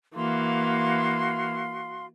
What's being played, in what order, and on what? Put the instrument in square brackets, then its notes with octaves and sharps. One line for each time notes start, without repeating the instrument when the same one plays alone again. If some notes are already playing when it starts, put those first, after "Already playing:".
[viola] E3 A#3 [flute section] F#4 F5 C6